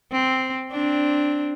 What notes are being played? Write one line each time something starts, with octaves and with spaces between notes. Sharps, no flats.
C4
C4 D4